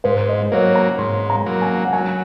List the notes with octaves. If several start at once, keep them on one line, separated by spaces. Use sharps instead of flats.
G#2 C5
D#5
F#3 A#3 C#5
A#5
G#2 C6
A#5
F#3 A#3
G#5
F#5
F#3 G#5